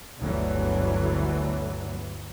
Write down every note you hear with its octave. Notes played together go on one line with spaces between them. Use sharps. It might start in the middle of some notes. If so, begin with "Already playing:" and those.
G1 D2 E3 F#3 A3